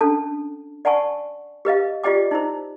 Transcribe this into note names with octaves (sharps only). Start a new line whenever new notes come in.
C#4 D4 A4 A5
D5 F#5 G#5 A5 C#6
G4 B4 D#5 F5
F4 G4 D5 D#5 G5 D6
D#4 E4 C5